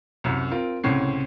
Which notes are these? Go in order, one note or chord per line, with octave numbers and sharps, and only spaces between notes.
C2 F#2
C4 F4 A#4
C2 A2 C#3 C4 C#5 C7